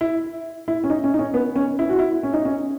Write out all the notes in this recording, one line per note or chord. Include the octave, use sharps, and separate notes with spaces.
E4
E4
C#4
D#4
C#4
D#4
C#4
B3
C#4
E4
F#4
E4
C#4
D#4
C#4